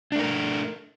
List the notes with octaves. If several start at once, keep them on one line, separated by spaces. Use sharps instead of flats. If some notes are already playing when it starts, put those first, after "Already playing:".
A3 D4 A#4